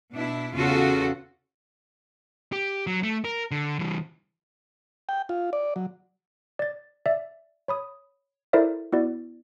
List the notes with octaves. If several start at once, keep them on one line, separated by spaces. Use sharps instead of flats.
B2 D4 E4
E2 C#3 F4 F#4 A4
G4
F#3
A3
A#4
D3
E3 G3
G5
F4
D5
F#3
D5 A6
D5 E5
C#5 B5 D#6
E4 A4 A#4 C5 D5 E5
B3 E4 F#4 D5